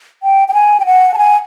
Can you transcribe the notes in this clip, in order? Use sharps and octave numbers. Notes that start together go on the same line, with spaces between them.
G5
G5
G#5
G5
F#5
A5
G#5